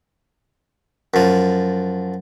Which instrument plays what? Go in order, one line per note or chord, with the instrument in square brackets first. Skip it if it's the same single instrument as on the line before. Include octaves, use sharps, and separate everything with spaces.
[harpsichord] F#2 F3